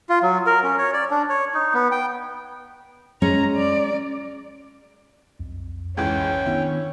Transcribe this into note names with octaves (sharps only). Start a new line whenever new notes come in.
F4
F#3
A#4
C#4
C#5
D5
D4
C#5
D#4
B3
G5
G#3 C#4 A#5
D5
B1 F2
C#2 G#2 E3 C#4 G5
D#3 B3 D4 E4